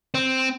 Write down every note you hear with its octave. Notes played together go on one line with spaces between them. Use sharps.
C4